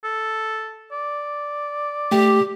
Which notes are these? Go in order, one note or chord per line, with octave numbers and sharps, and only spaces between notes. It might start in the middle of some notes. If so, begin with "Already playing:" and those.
A4
D5
A3 G4 G5